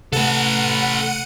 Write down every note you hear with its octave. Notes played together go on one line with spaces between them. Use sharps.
C3 A3 A4 B4 F#5 C#7 D#7